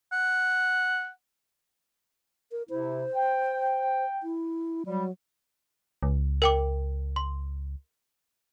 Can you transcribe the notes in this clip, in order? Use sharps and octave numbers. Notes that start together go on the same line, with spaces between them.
F#5
A#4
C3 E4 C5
G5
E4
F#3 G3
C#2
A#4 G5 D6
C6